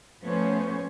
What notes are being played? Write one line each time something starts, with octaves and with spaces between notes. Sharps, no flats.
F3 A3 B3 C#4 C5 C#5